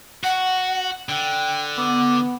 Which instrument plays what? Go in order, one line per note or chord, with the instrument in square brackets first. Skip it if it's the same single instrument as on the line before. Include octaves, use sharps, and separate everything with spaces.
[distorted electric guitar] F#4 [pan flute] F#5
[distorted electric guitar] D3 [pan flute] G5
[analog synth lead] B3 [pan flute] D6